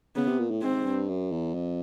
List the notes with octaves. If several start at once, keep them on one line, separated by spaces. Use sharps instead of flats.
C#3 B3
C3
A#2
A2
G#2 C4
G2
F#2
E2
F2